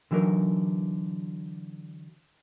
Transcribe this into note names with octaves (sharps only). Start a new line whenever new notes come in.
D3 E3 F#3 D#4 A#4